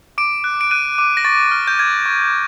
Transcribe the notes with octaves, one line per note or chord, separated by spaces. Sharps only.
D6 D7
F#6
D7
F#6 D#7
D6
A#6
C#6 A6
F6
G6
F6 G#6
C#6